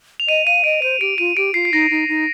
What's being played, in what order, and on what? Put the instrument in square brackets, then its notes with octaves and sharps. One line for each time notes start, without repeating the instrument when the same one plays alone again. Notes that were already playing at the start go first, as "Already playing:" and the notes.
[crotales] F7
[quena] D#5 [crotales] D#7
[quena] F5 [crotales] D#7
[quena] D#5 [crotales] D7
[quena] C5 [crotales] D#7
[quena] G4 [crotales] D7
[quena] F4 [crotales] D#7
[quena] G4 [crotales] D7
[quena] F4 [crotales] C7
[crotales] C7
[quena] D#4 [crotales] A#6
[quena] D#4
D#4